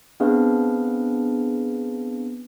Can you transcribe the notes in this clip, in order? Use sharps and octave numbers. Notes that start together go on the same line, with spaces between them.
B3 C4 D4 G#4 B4 F5